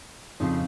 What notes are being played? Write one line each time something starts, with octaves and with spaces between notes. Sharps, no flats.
F2 C#3 F3 D#4